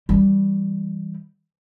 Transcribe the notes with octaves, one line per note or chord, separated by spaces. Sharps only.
E3 G3